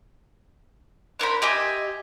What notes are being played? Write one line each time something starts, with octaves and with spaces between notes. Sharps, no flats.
D4 A#4 C5 B5
G4 D#5 E5 G#5